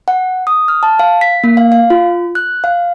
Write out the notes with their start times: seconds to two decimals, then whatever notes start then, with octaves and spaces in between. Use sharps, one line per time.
0.08 F#5
0.47 D#6
0.68 F6
0.83 A5
0.99 F5
1.21 B6
1.44 A#3
1.57 F5
1.72 F5
1.90 F4
2.35 F#6
2.64 F5